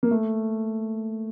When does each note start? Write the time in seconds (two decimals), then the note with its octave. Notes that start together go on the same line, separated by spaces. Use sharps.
0.03 A#3
0.11 A3